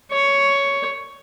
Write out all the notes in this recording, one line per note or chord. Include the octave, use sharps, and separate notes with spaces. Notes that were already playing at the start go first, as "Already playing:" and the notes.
C#5